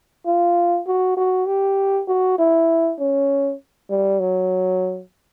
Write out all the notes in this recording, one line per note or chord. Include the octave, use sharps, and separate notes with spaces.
F4
F#4
F#4
G4
F#4
E4
C#4
G3
F#3